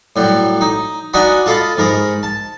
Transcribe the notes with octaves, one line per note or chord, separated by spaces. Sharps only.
A2 F#3 G3
D#4
D4 D#4 F#4 D#5 G#5 B5
F4 A4 D#5 F5 B5
G#2 A#4 B5 D#6
A5